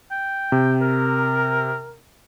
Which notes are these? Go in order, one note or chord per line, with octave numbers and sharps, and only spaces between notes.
G5
C3
A#4